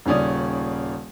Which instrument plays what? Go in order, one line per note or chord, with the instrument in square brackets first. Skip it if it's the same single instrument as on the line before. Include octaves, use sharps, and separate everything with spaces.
[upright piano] D#1 C#3 C#4 D5 D#6